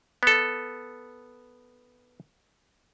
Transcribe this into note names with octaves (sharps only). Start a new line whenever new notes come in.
B3 A4